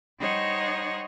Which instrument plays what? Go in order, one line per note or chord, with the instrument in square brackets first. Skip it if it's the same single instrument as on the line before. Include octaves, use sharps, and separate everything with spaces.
[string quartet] G3 D#4 C5 C#5 D#5 F#5